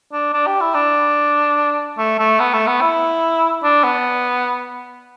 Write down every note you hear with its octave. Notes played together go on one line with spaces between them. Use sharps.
D4
D4
G4
E4
D4
A3
A3
B3
A3
B3
E4
D4
B3